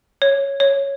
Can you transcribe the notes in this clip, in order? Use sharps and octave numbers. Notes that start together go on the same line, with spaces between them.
C#5
C#5